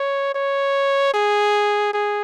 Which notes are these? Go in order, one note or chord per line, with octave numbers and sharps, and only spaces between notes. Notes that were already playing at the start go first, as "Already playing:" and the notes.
Already playing: C#5
C#5
G#4
G#4